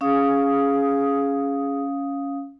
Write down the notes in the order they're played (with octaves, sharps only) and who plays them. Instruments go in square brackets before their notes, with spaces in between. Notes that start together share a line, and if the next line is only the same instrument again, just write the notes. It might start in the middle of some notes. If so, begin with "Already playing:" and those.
[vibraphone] C#4 F5 D#6 [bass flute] G#4